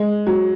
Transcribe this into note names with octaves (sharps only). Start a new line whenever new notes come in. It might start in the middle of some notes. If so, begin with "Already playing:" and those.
Already playing: G#3
F#3